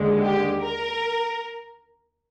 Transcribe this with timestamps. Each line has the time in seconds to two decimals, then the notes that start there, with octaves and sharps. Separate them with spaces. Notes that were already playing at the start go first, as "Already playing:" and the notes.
Already playing: D#2 D3 G#3
0.23 G4
0.61 A#4